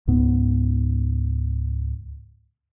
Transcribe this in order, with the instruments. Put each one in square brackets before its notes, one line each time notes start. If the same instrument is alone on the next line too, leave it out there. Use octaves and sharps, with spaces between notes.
[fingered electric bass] C#2 G#2 B3